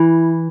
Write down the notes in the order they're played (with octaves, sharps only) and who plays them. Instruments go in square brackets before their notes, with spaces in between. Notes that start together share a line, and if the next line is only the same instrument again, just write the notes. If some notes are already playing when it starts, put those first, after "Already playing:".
Already playing: [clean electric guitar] E3 [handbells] E4